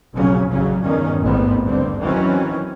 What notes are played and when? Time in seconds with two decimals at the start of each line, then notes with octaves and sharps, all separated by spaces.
0.13 F1 B1 C#3 F#3 C#4
0.50 A1 C#3 F#3 C#4
0.81 E2 G2 D#3 C#4
1.21 A1 D#2 G#2 B3 C4
1.64 G2 D3 C4
2.02 D#3 E3 F#3 C4 C#4